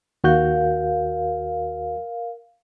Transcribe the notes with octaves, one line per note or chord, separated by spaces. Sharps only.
D#2 F#4 A#4 F5 G6